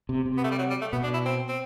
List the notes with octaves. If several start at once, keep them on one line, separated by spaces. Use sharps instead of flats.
C3
C3
B3
A3
G3
F#3
G3
A3
B2 B3
D4
E4
C4
C4